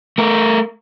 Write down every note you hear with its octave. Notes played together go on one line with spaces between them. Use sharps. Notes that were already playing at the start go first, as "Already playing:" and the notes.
A3 A#4